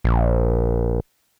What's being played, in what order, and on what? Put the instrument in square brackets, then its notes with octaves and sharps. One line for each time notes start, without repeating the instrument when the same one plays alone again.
[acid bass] A#1